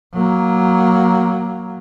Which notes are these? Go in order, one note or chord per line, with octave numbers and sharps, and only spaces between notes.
F#3 A#3